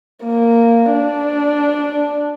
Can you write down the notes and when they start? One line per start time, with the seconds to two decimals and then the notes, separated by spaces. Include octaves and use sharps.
0.25 A#3
0.93 D4